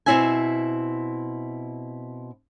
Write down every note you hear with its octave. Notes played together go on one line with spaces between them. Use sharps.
B2 B3 C4 E4 E5 G#5